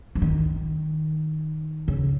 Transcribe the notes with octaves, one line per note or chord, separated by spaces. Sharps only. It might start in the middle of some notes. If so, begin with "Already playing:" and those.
F3
D#3
C#3